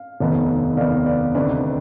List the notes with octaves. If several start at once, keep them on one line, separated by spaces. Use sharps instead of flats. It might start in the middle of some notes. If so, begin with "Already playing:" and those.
Already playing: F5
F1 D#2 D#3 B3
F1 D#2 D#3 B3 D5 F5
B4 D5
D2 C3 D#3 B4 D5